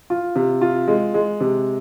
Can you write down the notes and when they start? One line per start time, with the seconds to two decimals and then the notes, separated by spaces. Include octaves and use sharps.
0.10 F4
0.36 C3
0.61 F4
0.88 G#3
1.14 G#3
1.40 C3